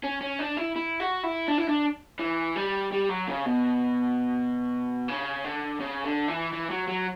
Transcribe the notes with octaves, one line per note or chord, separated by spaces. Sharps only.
C#4
C#4
D4
E4
E4
F#4
E4
D4
E4
D4
E3
G3
G3
F#3
C#3
B2
C#3
D3
C#3
D3
E3
E3
F#3
F#3